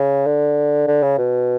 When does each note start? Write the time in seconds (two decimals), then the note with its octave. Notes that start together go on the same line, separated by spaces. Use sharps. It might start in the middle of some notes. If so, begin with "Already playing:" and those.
Already playing: C#3
0.27 D3
0.87 D3
1.03 C#3
1.18 B2